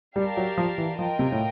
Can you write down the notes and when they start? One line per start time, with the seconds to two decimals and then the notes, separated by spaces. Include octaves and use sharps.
0.16 G3 G4 A#4 D5 F5 A5
0.37 F#3
0.57 F3
0.78 E3
0.99 F3 F4 A#4 D#5 G5
1.19 C3
1.32 A2